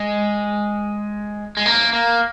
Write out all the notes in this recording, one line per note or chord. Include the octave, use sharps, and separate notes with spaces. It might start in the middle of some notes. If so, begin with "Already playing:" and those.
Already playing: G#3
G#3
A#3
A#3